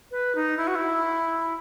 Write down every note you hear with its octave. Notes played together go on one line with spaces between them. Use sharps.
B4
D#4
E4
F#4
E4